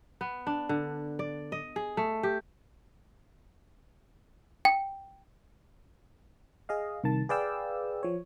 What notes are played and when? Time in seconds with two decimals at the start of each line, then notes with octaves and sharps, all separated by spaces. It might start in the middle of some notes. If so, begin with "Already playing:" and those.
0.21 B3
0.47 D4
0.69 D3
1.19 D5
1.52 D#5
1.76 G#4
1.97 A3
2.23 G4
4.65 G5
6.69 G#4 D#5 F5
7.04 C2 D#3 A5
7.29 G#4 B4 D5 F5 G5 E6
8.03 F3 C#5